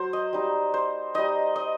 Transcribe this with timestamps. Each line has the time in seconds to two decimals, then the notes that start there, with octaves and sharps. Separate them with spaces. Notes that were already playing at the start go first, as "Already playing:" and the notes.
Already playing: F#3 C5
0.13 D#5
0.33 G3 D#4
0.74 C5
1.14 G3 D#4 D#5
1.56 D#5